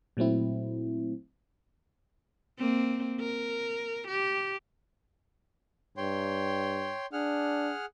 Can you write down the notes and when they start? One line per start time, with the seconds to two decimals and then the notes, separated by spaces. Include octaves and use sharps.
0.17 A#2 F#3 A3 C4 E4
2.58 A#3 C4
3.20 A#4
4.08 G4
5.97 G2 C#5 G5 C6
7.13 D4 G#4 F#5 F6